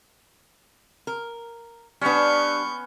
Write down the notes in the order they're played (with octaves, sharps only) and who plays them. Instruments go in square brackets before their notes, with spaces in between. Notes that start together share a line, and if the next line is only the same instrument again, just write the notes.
[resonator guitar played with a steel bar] A#4
[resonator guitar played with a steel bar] G3 D4 [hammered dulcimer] B3 C#4 [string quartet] C#6 G6